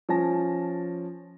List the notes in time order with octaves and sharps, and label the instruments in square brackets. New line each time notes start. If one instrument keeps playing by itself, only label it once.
[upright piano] F3 C#4 G#5 A5 A#6